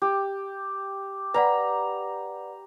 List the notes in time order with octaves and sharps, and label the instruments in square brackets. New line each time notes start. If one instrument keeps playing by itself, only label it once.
[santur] G4
[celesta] B4 D5 F#5 [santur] A#5 B5